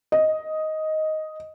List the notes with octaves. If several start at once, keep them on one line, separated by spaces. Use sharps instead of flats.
D#5